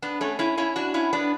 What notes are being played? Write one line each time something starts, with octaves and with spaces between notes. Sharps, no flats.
B3 D4
A3 C#4
C#4 E4
C#4 E4
D4 F#4
C#4 E4
B3 D4